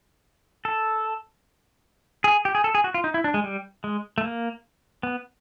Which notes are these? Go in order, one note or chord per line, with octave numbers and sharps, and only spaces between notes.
A4
G#4
G4
G#4
A4
G#4
F#4
F4
D#4
E4
D4
G#3
G3
G#3
A3
A#3
B3